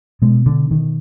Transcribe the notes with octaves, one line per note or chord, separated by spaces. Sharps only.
B2 G#3
D3
D#3